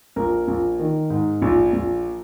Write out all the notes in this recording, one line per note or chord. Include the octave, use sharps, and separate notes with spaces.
A#1 A#4
A#1
D#3
G#2
A#1
A#1